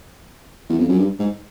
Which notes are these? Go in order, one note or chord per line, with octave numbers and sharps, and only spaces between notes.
E2
F2
F#2
G2
G#2